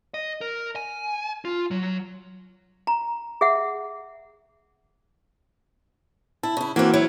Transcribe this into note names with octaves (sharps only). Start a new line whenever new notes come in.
D#5
A#4
G#5
F4
F#3
A#5
G#4 E5 F#5
E4 A5
C#3 E4
E3 A#3 C4 F#4
F#3 E4 C#5